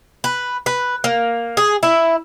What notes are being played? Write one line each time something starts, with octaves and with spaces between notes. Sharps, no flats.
B4
B4
A#3
G#4
E4